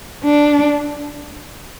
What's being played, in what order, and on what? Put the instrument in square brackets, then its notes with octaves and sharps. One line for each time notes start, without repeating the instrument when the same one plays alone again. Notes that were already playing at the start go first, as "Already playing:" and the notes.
[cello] D4